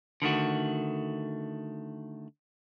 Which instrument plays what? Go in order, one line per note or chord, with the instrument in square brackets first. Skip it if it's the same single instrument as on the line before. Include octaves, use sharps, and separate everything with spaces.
[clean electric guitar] D3 D#3 A3 F#4